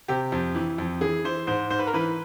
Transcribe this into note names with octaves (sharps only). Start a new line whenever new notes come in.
C3 G4
F2
E3
F2
E3 G#4
E3 C5
G#2 C5
G#2 C5
B4
A#4
E3 B4